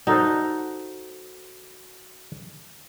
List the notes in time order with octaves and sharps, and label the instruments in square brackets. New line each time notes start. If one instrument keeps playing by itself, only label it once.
[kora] D#4 [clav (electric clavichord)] F#4 A4 C5